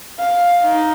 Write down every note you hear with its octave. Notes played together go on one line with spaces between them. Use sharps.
F5
D#4